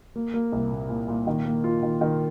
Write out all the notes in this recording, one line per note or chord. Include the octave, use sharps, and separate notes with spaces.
A#3
A#3
C2
A#2
A#2
A#2
D#3
A#3
F4
D#3
D#3